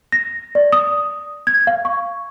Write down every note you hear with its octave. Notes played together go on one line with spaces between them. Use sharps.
A#6
D5
D#6
G#6
F5
C#6